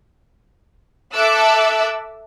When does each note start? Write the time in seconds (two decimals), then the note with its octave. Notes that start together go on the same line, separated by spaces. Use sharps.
1.14 A4 E5 A5 D6 E6 F#6